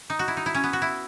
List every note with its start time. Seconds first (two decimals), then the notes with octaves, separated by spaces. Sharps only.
0.10 D#4
0.19 F#4
0.28 E4
0.37 D#4
0.46 E4
0.55 C#4
0.64 B3
0.73 F#4
0.82 E4